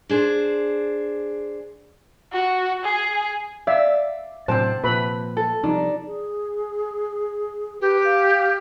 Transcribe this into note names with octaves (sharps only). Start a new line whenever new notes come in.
D4 G#4 C5
F#4
G#4
D5 E5 F5
A2 C3 F#3 D4 C5 G5 A5
A#2 F3 B4 B5
A4
C3 F3 G3 D4 D#4
G#4
G4 B4
F5